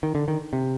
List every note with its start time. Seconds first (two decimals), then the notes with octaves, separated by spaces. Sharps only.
0.03 D#3
0.15 D3
0.28 D#3
0.53 C3